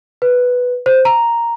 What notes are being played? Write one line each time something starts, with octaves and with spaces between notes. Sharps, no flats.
B4
C5
A#5